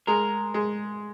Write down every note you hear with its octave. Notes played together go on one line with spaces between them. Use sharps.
G#3 A#4
G#3